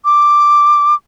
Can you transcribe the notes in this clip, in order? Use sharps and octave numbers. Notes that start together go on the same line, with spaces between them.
D6